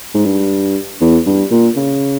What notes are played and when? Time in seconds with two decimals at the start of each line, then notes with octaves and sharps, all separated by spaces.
0.15 G#2
0.26 G2
1.01 E2
1.27 G2
1.51 A#2
1.76 C#3